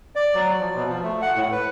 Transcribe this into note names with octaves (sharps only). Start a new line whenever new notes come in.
D5
F#3
F3
B2
F3
A3
F#5
A2
B4